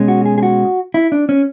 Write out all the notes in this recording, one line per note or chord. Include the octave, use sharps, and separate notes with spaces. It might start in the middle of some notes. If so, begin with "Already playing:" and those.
Already playing: B2 G#3 C#4
F#4
G#4
G#4
F#4
E4
D4
C#4